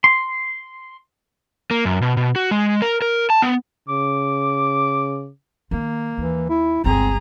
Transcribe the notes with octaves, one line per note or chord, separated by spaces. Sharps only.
C6
A#3
F#2
B2
B2
F#4
G#3
A#4
A#4
A5
B3
C#3 D6
D#3 A#3 F4
D#2 E3
E4
G1 C#2 C4 G#4 A#5